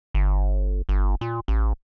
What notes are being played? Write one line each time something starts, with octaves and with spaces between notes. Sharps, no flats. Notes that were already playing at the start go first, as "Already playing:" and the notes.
G1
G1
A#2
A1